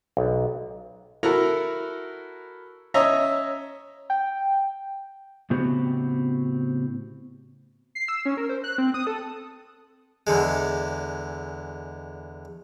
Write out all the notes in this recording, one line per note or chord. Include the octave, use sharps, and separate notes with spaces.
B1
E4 F#4 A4 A#4 F#5 A#5
C#4 C#5 D#5 E5 A#5
G5
A2 C#3 B3 C4 F#4 G4
C7
E6
C#4
A#4
C5
F#6
C4
D#6
A4
E2 D3 G#3